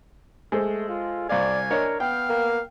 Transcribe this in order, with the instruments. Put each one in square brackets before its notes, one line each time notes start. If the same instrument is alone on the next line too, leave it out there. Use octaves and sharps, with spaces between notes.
[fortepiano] G#3 A4 C5 [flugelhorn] A3
[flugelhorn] F4
[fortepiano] C2 F5 [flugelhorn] D5 [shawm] G#5
[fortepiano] D4 C#5 D#5 [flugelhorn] A#4
[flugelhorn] B3 [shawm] F5 [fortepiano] G5
[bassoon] A#3